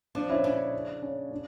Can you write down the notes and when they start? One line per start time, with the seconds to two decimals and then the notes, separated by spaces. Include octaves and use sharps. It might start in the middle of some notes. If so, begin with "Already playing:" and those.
0.15 F3 D4
0.29 C#4 E4
0.44 C#3 D4
1.02 C#4
1.31 D4